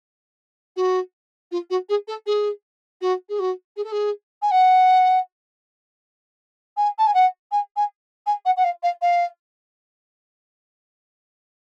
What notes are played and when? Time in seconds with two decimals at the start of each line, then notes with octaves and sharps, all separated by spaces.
0.76 F#4
1.51 F4
1.70 F#4
1.89 G#4
2.07 A4
2.26 G#4
3.01 F#4
3.28 G#4
3.39 F#4
3.76 G#4
3.84 A4
3.91 G#4
4.42 G#5
4.51 F#5
6.76 G#5
6.98 A5
7.06 G#5
7.14 F#5
7.51 G#5
7.76 G#5
8.26 G#5
8.45 F#5
8.56 F#5
8.64 F5
8.82 F5
9.01 F5